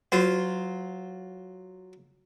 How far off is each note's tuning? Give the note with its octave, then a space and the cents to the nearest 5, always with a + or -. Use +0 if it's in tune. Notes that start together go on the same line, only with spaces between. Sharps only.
F#3 +0 F4 +0 C5 -40